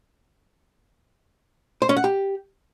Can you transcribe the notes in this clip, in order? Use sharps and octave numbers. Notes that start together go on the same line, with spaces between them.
C5
C#4
F#5
G4